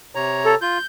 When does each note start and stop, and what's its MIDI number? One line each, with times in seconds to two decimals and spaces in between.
0.15 0.55 48
0.15 0.55 73
0.15 0.55 82
0.45 0.55 69
0.62 0.78 65
0.62 0.86 91